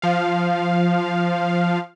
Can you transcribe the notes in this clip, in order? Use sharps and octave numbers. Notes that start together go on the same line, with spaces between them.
F3 F5